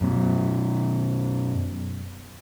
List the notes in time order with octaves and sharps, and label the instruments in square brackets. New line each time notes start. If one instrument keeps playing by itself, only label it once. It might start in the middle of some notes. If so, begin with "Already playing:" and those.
[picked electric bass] F#2 B2